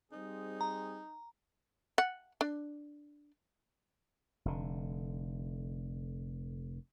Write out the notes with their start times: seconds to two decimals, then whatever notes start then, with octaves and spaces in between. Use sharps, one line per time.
0.12 G3 C4 D#4 G#4
0.61 A#5
1.98 F#5
2.41 D4
4.45 F1 D3